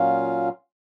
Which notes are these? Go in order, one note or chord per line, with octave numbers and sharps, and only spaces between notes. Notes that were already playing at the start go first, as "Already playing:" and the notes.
Already playing: A#2 F#3 C#4 F4 F5